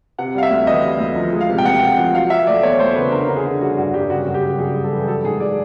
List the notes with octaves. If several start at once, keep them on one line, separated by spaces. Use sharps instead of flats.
C3 F#5
G3 F5
E5
D2
E3 D#5
G3
D2
F3
G#3
F5
C3
G5
D2 F#5
C3
F3
F#3 F5
F#3 E5
A3 D5
E2 C#5
A3 C5
C#3 B4
D3 A#4
D3
G#4
D3
G3 F#4
G2 F#4
G2 G4
C#3 F#4
F#2
G4
C#3
F#2 G#4
G3
A4
E3
G#4
F#3 A4
G#2 G#4
D5